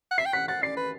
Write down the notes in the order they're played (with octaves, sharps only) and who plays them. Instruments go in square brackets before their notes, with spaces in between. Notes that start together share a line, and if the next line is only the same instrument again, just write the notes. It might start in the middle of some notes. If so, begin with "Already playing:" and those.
[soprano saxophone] F#5
[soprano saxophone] E5 [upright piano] C7
[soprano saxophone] G5
[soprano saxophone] F#5 [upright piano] B6
[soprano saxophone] F#5 [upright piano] A6
[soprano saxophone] D5 [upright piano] C7
[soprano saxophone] B4